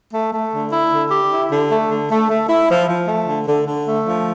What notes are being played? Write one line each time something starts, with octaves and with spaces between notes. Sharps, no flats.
A3
A3
D3
E4
D3
G4
E4
D3
A3
D3
A3
A3
E4
F3
F3
A3
D3
D3
D3
A3
F3